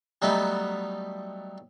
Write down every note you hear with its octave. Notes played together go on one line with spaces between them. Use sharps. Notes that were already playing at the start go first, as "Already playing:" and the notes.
F#3 G3 A3 B3 D#4